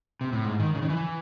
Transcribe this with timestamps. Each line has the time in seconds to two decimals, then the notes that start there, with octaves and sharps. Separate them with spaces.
0.21 C3
0.33 A2
0.44 G#2
0.60 D#3
0.75 C#3
0.82 D#3
0.90 E3